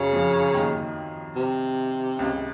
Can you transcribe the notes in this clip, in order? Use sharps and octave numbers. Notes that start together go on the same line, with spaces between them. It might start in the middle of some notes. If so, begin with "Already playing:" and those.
Already playing: F#2 C#3 F#3
F2 F3
D#2 D#3
C3
C#2 C#3